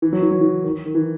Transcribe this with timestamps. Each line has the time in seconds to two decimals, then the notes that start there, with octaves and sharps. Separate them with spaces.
0.02 E3
0.13 F#3
0.22 E3
0.31 F#3
0.41 E3
0.64 D#3
0.85 D#3
0.95 E3